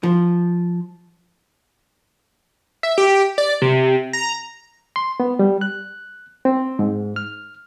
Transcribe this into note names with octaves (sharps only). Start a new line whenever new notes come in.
F3
E5
G4
D5
C3
A#5
C6
B3
G3
F#6
C4
G#2
F6